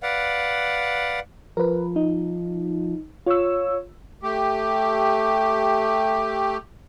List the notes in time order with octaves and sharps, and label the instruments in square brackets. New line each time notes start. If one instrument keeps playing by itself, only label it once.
[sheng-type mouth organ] B4 D5 F5 F#5
[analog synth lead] F3 [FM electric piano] A#4 B4
[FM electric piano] D#4
[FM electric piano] F4 E6 [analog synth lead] C#5
[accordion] A3 G4